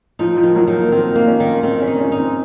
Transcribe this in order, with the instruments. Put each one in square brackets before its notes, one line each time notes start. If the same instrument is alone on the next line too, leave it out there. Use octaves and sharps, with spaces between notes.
[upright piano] F3 [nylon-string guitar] D#4
[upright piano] F3
[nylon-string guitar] D#3
[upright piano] F#3
[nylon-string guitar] D#3
[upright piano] A#3
[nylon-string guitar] D#3 [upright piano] C4
[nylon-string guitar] A#3
[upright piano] C#4
[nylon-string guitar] D#3
[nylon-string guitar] D#3 [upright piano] C4
[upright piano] C#4
[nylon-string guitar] D#4
[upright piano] C#4
[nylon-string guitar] D#4
[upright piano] C4